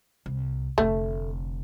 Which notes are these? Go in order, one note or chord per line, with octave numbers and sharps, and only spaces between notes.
C2
F1 D3 A3